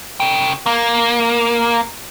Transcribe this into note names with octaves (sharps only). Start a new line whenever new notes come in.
C#3 G5
A#3